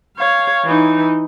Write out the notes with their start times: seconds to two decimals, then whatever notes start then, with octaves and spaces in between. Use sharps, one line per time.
0.17 C#5 F5
0.65 E3 D#4